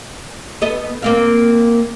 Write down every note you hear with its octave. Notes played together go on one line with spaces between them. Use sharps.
B3 A4 D#5
A#3 C4 F5